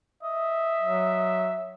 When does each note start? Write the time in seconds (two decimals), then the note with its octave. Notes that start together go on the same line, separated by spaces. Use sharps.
0.23 D#5 E5
0.82 F#3